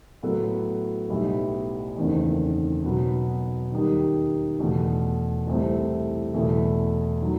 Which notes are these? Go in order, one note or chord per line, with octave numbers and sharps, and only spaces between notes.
A2 F#3 B3 F#4 A4
B1 A2 G3 B3 E4
F#1 E2 D#3 A3 C4
B2 F#3 B3
D#2 D#3 G3 D#4
E2 B2 A3
C2 C3 E3 A3 C4
E2 B2 A3 E4 A4
D#3 F#3